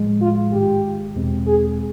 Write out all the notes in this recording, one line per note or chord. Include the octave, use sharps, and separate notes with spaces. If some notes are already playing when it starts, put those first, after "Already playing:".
Already playing: A2 F3 G#3
F4
G#2 D#3 G#3 G4
E2 B2 G#3 C4
G#4